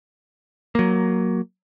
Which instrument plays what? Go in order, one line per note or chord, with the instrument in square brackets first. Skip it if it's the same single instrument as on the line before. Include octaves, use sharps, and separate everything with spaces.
[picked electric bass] F#3 A#3